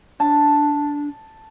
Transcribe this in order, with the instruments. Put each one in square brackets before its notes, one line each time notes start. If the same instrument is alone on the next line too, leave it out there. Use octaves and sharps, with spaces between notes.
[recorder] D4 [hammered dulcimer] A5